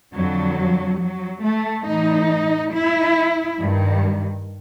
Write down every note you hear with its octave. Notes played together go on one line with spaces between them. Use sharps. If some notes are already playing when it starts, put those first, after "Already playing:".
F2 D3 F#3
F#3
A3
A2 E3 D#4
E4
G2 D#3